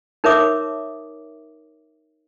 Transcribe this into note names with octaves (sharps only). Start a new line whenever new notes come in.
D#4 A#4 C#5 E5 D6 D#6